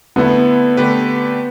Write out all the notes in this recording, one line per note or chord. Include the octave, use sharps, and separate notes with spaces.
D3 A3 B3 E4
D3 A3 G4 B4